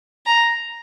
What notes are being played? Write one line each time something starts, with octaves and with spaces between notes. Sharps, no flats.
A#5